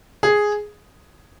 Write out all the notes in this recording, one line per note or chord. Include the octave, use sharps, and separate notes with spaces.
G#4